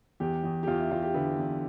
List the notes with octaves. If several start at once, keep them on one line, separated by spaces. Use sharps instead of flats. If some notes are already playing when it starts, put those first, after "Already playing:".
E2 G4
E2
G4
E2 F4
E4
E2 F4
G4
D3 B4
E2